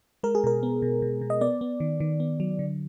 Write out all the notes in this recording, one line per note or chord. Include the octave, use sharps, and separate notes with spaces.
G#3 A#4
G#4
B2 A#4
B3
B2
B2
B2
D#5
B3 D5
B3
D#3
D#3
B3
F#3
D3